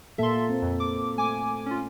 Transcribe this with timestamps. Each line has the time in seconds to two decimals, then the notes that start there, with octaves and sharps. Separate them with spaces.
0.18 A#2 A#3 A4 E5 C6
0.49 C4
0.62 F2
0.80 D6
1.18 A3 G#5 D6
1.66 C#4 F4